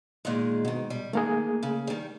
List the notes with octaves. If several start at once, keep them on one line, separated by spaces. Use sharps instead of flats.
A#2 D#3 G#3
G#2 B2 D#3
G3
D#3 A3 A#3 G#4
C#3
D#3 G3